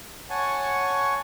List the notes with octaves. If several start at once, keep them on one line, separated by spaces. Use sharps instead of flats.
C#5 F#5 G#5 A5 C#6